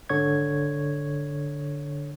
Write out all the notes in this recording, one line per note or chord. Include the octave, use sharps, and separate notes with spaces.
G#1 D3 C#5 C#6 G#6